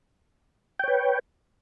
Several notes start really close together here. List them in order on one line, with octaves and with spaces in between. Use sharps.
G5 C#5 B4